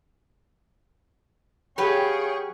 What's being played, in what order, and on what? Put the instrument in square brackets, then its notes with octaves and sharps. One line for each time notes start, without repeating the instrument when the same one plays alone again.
[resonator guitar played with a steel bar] F#3 G4 B4 [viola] G#4 C#6 [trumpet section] C#5 F5 G5